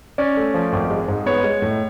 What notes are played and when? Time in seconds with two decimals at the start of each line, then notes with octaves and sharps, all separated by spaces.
0.18 C#4 D5
0.37 A3
0.54 F3
0.73 G#1
0.90 G#3
1.08 G#2
1.26 B3 C#5
1.44 G#3
1.62 A2